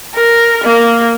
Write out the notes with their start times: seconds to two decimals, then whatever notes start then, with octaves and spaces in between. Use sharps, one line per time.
0.15 A#4
0.64 A#3